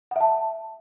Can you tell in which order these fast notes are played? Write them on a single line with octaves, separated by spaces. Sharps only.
F#5 E5 A5